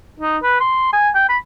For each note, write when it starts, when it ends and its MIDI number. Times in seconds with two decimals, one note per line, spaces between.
0.20 0.38 63
0.43 0.58 71
0.60 0.92 84
0.93 1.10 80
1.15 1.27 79
1.29 1.38 83